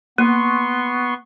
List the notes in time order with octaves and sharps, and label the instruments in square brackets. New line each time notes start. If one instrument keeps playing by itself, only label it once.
[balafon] A#3 [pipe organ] B3 C6 C#6